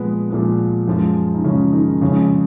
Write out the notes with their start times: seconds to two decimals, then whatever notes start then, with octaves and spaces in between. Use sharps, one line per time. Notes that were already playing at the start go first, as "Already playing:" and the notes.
Already playing: A#2 F3 G#3 B3 B4
0.30 A#2 F3 G#3
0.88 F#2 F3 G#3
1.34 D#4
1.44 F#2 C#3 F3 G#3 C#4
1.73 D#3 D#4
2.01 F2 C#3 F3 G#3 C#4